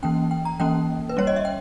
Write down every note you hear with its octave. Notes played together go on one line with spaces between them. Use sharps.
E3 A#3 C#4 G5
G5
A#5
E3 A#3 C#4 G5
B4
G3 C#4 C#5
D#5
E5
G5